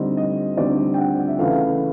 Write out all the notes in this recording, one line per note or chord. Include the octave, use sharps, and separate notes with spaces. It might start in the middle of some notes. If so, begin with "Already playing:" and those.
Already playing: D2 D3 G3 C4 D#4 D#5
D#5
D2 D3 G3 C4 D#4 D5
G5
F#5
E5
E2 C#3 E3 A3 F5